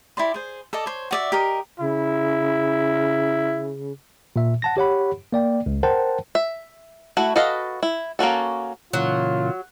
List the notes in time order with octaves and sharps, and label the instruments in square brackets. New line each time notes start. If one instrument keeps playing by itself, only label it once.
[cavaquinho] E4 G4 D5 C6
G#4 C5
A4 D5 D#5
C5 C#5
F#4 D5 E5
G4 A#4 D#5
[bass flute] C#3 [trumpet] E4
[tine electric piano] A#2 E5
F#5 A5 A#6
G4 C#5 F#5 B5
A#3 D5 G5
C#2
A#4 C5 F#5 G5 A5
[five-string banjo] E5
A3 E4 F#4
F#4 A4 B4 D#5 F5
E4
A#3 C#4 F#4 A4
[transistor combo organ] A#2 C#3 E3 [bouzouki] F#3 [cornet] F4